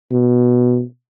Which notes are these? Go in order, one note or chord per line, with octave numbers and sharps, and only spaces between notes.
B2